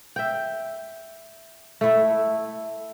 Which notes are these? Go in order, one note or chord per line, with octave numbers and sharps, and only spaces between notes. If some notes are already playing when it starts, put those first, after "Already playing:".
E5 G5
A3 E4